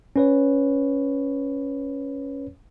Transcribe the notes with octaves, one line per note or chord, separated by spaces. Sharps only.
C#4 B4 C#5